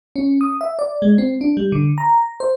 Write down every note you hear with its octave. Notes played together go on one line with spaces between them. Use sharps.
C#4
D#6
E5
D5
G#3
C4
D4
G3
D3
A#5
C5